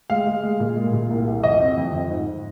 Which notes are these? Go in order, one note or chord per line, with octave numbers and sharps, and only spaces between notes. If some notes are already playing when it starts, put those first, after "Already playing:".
G#3 F5
G#3
G#3
A#2
G#3
A#2
C2
C2
F2 D#5
C4
F2
F2
G#2